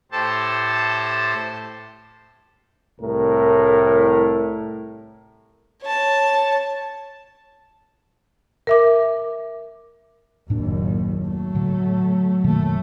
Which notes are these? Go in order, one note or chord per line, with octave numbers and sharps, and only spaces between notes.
A2 G4 A4 C5 A5
C2 A2 A#4
C#5 A5
A#4 E5 D6
F#1 D#2 A2 D4
F#3 A3
A2 D3
F#2 B2 D#3 A3 A#3